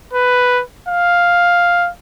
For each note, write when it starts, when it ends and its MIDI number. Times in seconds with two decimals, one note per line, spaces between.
0.13 0.62 71
0.89 1.89 77